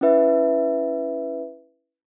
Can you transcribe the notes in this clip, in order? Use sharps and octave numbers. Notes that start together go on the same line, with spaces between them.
C#4 E4 B4 E5